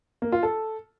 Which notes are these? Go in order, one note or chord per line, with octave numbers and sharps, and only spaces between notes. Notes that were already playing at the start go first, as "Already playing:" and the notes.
A#3
F4
A4